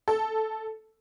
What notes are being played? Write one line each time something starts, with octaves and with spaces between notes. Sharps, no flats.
A4